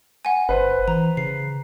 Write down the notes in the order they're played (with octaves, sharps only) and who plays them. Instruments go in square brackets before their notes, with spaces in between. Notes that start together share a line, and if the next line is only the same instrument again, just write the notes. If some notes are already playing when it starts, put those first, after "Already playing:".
[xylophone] F#5 G#5
[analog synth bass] G1 [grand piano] B4 C5
[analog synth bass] E3 [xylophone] A#5
[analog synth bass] C#3 [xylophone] C7